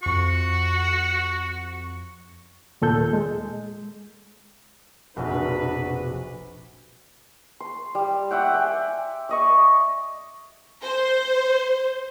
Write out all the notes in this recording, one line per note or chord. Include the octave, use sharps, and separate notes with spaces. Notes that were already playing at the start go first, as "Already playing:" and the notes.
F2 F#4 C#6
D#2 A#2 A4 G6
G#3
F1 A#1 B2 D4 F#4 B4
C6
G3
D5 E5 F#5 G5
G5 G#5
D5 D#5 C#6
C5